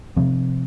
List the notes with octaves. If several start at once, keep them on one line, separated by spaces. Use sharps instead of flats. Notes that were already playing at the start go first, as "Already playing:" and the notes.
C3 F3 C4